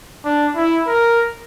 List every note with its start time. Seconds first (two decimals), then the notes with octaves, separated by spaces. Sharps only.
0.25 D4
0.56 E4
0.88 A#4